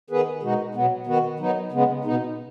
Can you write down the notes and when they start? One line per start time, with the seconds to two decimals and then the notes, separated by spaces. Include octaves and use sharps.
0.10 D#3 B3 G#4 B4
0.43 B2 G#3 D#4 F#4
0.75 B2 F#3 B3
1.07 D#3 B3 F#4
1.39 F#3 B3 D#4
1.72 C#3 G#3 B3
2.04 B2 B3 D#4